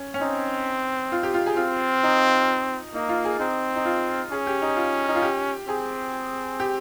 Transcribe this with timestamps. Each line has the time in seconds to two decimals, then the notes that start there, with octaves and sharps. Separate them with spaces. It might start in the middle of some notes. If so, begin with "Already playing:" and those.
Already playing: C#4
0.14 C#4
0.21 C4 D#4
1.12 F4
1.23 G4
1.34 F4
1.46 G#4
1.57 C4 F4
2.03 D#4
2.94 A#3 D#4
3.09 F4
3.25 G#4
3.39 C4 D#4
3.76 D#4
3.85 F4
4.31 C#4 G#4
4.47 G4
4.62 D#4
4.77 F4
5.08 D#4
5.15 F4
5.22 G4
5.68 C4 G#4
6.60 G4